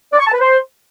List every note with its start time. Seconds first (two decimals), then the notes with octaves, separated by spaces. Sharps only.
0.13 D5
0.20 C#6
0.27 A5
0.34 B4
0.41 C5